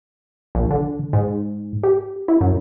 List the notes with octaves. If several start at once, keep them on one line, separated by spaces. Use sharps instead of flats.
A#1
D3
G#2
G4
E4
F#2